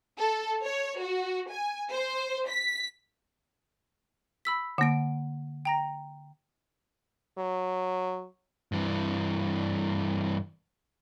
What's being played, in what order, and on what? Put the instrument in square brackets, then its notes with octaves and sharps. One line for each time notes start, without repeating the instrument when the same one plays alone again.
[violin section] A4
C#5
F#4
G#5
C5
B6
[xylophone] B5 E6 B6
[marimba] D3 A#3 [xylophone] F#5 D7
[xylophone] G5 A#5 A#6
[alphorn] F#3
[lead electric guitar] G2 E3